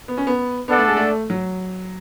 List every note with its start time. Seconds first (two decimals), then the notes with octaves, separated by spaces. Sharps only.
0.08 B3
0.18 C#4
0.27 B3
0.68 B3 D4 A4 D5 F#5
0.78 A3
0.88 G#3
0.97 A3
1.30 F#3